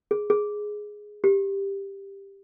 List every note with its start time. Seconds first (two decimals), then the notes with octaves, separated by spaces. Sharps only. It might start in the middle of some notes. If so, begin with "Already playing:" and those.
0.11 G#4
0.30 G#4
1.24 G4